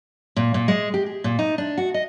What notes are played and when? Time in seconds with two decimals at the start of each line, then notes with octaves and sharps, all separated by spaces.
0.36 A#2
0.54 A#2
0.68 G#3
0.94 G4
1.06 G#4
1.24 A#2
1.39 D#4
1.58 D4
1.77 F#4
1.94 D#5